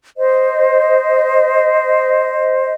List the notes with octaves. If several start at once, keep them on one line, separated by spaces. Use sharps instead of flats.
C5 D#5